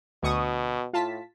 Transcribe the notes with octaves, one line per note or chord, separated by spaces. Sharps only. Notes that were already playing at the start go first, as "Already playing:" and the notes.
D2 B2 C#6 D#6
A2 F4 A5 B6